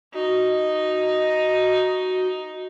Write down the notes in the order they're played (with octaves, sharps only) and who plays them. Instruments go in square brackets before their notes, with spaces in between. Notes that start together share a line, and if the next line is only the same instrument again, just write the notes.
[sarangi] D#4 [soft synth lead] F#4